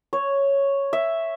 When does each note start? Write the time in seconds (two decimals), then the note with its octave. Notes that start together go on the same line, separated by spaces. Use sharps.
0.13 C#5
0.93 E5